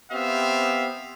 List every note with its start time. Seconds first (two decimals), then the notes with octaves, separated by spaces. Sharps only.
0.11 B3 C4 G4 E5 F5